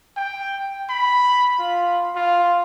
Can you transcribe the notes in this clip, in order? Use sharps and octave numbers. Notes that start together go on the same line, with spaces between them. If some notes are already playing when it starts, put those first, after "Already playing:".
G5
B5
F4
F4